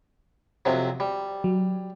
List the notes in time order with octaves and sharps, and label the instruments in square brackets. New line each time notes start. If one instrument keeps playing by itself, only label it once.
[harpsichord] F2 C3 F#3
G3
[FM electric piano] F#3